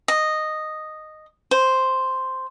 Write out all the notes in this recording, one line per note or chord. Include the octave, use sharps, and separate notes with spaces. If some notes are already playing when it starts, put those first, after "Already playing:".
D#5
C5